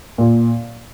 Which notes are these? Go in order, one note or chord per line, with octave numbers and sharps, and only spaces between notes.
A#2